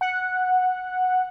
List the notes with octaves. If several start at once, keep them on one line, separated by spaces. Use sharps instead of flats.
F#5